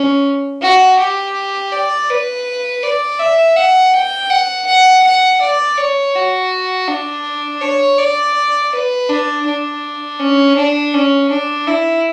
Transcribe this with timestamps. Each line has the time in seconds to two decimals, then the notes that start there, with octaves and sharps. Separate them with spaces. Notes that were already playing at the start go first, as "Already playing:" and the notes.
Already playing: C#4
0.62 F#4
0.99 G4
1.72 D5
2.10 B4
2.83 D5
3.20 E5
3.57 F#5
3.94 G5
4.30 F#5
4.67 F#5
5.04 F#5
5.42 D5
5.78 C#5
6.15 F#4
6.88 D4
7.62 C#5
7.98 D5
8.73 B4
9.09 D4
9.46 D4
10.20 C#4
10.56 D4
10.94 C#4
11.30 D4
11.67 E4